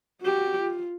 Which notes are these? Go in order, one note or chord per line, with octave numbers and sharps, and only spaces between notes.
F#4 G4
F4